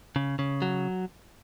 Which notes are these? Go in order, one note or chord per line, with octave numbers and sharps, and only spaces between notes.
C#3
C#3
F#3